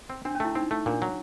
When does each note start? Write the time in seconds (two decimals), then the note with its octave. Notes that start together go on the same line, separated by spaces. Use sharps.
0.10 C4
0.25 C4 D4
0.35 C#4
0.40 A3 E4
0.55 C4 D#4
0.71 A3
0.86 A#2 D4
1.02 F#3